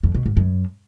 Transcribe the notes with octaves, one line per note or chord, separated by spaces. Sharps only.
F2
B2
G#2
F#2